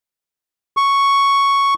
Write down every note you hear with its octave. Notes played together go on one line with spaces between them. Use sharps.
C#6